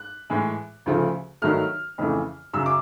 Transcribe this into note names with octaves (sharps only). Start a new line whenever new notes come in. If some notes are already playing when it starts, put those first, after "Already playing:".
Already playing: F#6
A2 E3 G#3
D2 C#3 F3 A3
G2 D#3 F#3 A3 F6
F2 C#3 E3 A3
F#2 C#3 F#3 E6
D6